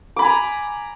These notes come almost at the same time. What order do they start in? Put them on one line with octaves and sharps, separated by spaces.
D6 B5 G#5 A#5